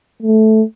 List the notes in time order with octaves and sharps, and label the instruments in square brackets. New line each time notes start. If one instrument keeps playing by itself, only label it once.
[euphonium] A3